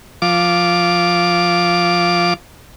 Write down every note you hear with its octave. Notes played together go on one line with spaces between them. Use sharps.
F3 D6